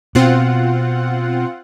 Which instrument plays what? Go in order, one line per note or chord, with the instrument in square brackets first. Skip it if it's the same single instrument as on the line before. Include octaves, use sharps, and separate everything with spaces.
[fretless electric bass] B2 [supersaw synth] C4 F4 F#5